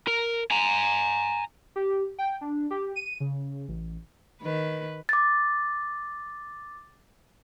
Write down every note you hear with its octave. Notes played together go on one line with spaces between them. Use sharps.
A#4
G#5 A#5
G4
G5
D4
G4
D#7
C#3
A1
D#3 B4
D6 A6